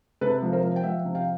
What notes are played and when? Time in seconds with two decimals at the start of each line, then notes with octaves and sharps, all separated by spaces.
0.21 C3 A4 B4
0.42 F3
0.53 A#4 C5
0.63 F3
0.76 G5
0.84 F3 E5 F#5
1.05 C3
1.15 F5 G5